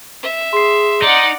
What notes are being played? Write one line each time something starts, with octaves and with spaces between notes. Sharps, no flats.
E5
G#4 C6 C7
D#4 D5 F#5